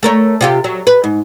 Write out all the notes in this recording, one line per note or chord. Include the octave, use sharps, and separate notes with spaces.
A3 A#4 C#5
C3 F4 G4
F#3
B4
G#2